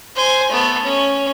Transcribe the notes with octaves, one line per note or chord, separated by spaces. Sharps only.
C5 G#5
A3 B3
C#4